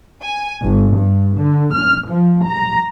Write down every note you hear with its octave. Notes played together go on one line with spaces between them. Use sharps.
G#5
G1
G2
D3
F6
F3
A#5